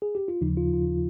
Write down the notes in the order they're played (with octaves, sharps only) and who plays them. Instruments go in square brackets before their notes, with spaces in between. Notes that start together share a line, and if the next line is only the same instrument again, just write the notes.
[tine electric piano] G#4
G4
F4
D#2 C#3 F3 D#4
F4
F4